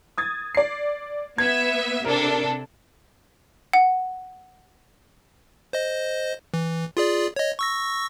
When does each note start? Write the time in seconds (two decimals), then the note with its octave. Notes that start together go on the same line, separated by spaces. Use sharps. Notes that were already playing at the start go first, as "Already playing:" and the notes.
0.18 D#6 G#6 A6
0.55 D5 C7
1.38 B3 E5 G#6
2.05 C3 D4 A4 A#4
3.73 F#5
5.73 C5 D#5
6.54 E3
6.97 F4 G#4 D5
7.36 C#5 D#5
7.59 C#6 E6 A#6